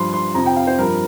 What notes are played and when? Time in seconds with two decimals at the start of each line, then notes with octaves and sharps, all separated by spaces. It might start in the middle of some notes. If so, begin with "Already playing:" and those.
Already playing: G2 F3 C6
0.13 C6
0.35 F2 C3 F3 A#5
0.46 G5
0.56 F5
0.67 C5
0.78 G2 F3 A#4